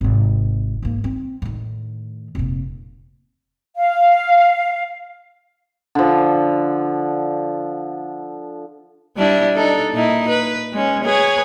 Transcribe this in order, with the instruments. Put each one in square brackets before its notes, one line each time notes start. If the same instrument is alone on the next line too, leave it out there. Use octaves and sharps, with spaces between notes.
[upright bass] G#1 C3
G#2 A#3
C4
A2 D#3
F1 A#2
[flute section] F5
[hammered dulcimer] D3 F3
[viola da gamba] G3 D4 E4
D4 D#4 A4
A#2 D#4 E4
B4
G#3 C#4
G#4 B4 C#5